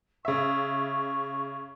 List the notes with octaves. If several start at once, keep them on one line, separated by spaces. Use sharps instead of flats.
C#3 E5 C#6